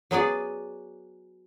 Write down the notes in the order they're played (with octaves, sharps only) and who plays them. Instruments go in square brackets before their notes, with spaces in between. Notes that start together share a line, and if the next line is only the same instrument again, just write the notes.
[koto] F#3 B3 G#4 D5